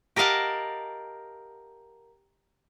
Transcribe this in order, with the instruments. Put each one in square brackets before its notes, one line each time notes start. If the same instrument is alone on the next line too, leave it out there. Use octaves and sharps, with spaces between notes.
[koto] G4 A#4 D#5 F5 F#5 A5